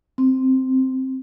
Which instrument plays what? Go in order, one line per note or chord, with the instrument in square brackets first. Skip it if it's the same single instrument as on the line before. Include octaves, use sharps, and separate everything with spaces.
[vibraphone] C4